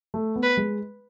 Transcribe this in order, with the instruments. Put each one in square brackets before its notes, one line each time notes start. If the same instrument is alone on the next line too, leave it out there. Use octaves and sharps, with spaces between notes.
[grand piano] A3
B3
[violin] B4
[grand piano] G#3